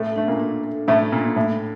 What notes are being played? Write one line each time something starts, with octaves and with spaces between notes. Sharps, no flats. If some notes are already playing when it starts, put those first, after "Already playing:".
Already playing: A2 A3 A4
A3 D4
A#2 A#3
D4
A4
A2 A3 A4
A#2 D4
A2 A4